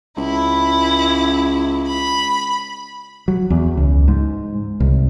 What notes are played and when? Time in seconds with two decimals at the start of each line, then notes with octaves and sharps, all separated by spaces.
0.17 C#2 E4
1.86 B5
3.28 F#3
3.50 E2
3.77 C#2
4.08 G#2
4.80 C2